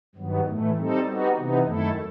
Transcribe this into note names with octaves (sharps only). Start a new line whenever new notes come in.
G2 D#3 F#3 B3
A2 E3 A3
G3 C4 D#4 A4
G3 B3 D#4 F#4
C3 E3 B3 D#4
F#2 D#3 A3 E4 A4